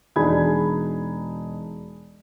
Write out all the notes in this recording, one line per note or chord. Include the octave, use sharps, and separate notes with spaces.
E1 D4 D#4 G#4 B5 G#6